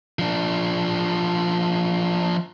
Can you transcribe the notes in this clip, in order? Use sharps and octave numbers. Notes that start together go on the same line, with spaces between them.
F3 D4